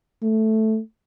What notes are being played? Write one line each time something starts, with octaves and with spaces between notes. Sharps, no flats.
A3